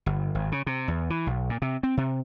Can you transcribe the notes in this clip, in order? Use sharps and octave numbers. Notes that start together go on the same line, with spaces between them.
G1
G#1
C#3
C3
E2
E3
B1
A#2
C3
C4
C3